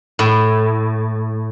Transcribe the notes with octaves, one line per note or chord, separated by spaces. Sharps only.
A2